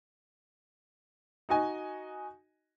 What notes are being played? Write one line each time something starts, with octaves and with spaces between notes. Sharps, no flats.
D#4 F#4 D#5 G#5